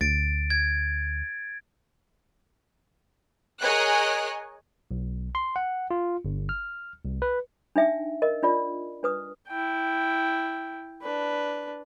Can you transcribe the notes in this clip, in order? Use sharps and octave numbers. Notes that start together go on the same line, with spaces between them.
D2 A6 D7
G#6
G#4 A#4 C#5 D#5 G#5 F#6
B1
C6
F#5
F4
G1
F6
C2
B4
D4 D#4 E5 G5
A#4 D#5
D4 F4 D5
D4 B4 D#6
E4 G5
D4 B4